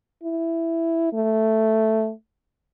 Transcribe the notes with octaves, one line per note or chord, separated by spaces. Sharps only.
E4
A3